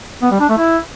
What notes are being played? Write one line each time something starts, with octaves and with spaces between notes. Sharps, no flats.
B3
G3
D4
A3
E4